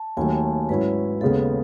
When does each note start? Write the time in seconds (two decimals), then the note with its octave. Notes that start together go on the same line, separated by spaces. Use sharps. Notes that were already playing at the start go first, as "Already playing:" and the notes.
Already playing: A5
0.17 D#2 D#3 F#3 A3 G#5
0.69 G#2 F#3 C#4 E4 B4
1.21 D#2 C#3 G#3 B3 A4